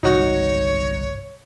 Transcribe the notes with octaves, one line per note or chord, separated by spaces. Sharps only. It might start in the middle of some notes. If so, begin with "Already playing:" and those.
G1 C2 G#2 D#4 F#4 C#5